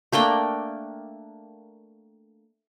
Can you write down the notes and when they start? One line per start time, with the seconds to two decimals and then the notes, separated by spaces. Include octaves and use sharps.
0.12 A3 A#3 D4 G5